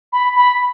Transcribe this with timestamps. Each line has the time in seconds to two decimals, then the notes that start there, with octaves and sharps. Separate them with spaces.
0.13 B5
0.35 B5